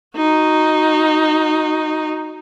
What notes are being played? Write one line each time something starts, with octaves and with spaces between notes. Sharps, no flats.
D#4 F#4